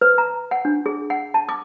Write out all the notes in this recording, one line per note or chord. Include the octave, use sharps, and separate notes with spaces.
B4
A#5
F#5
D4
G#4
F#5
A5
D6